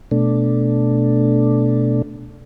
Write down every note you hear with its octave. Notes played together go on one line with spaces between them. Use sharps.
B2 A3 D4